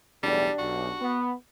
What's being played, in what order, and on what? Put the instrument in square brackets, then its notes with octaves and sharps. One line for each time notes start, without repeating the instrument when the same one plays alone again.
[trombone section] B1 E2 A2 [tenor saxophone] G3 [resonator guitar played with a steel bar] D4 G4
[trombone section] B1 [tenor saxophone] F#4
[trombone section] B3